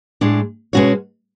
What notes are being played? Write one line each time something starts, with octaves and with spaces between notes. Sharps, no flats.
A2 G#3 D4
B2 G#3 C#4 F#4 C#5